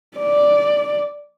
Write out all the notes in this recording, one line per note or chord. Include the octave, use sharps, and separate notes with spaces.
D5